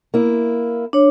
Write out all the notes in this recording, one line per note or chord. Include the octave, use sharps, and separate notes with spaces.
A#3 E4
D4 C#5